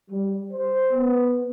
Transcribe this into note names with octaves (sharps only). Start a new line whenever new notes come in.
G3
C5
B3